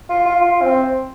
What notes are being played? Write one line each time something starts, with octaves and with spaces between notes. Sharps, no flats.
F4
F4
F4
C4